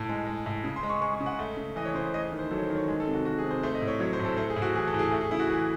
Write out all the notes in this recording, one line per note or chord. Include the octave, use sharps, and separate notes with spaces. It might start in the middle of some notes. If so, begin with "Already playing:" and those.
Already playing: A2 A5
G#3
G#3
A2
C#3
C6
G#3
C#6
G#3 C#6
C#6
C#3
F#5
A3
C#3
E3 D#5
C#5
C#3 C5
A3 D#5
D#3
C5
F#3 A4
C#5
C5
D#3
C#5
G#3
A4
C3
F#4
D#3 F#4
G#4
C3
C5
A3 C5
D#5
A2
C#5
F#3 C#5
C5
A2
A4
A3 C5
G#4
A2
F#4
E3 G#4
A4
A2
G#4
A3 F#4
G#4
C#3 E4
F#4
E3 G#4